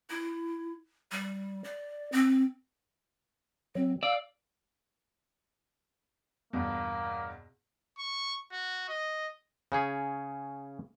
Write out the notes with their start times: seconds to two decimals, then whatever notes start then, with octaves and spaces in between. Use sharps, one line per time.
0.10 E4
1.12 G3
1.64 D5
2.12 C4
3.75 F#3 C4
4.03 D5 F5 E6
6.53 E2 G2 B2 A#3
7.98 C#6
8.52 F#4
8.89 D#5
9.72 C#3 C#4 G#4